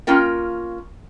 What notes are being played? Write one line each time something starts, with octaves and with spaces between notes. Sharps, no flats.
A#3 C#4 F4 A#4 G5